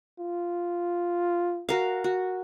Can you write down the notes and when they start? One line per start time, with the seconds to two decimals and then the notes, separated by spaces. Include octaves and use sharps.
0.19 F4
1.69 F#4 A#4 F5
2.04 F#4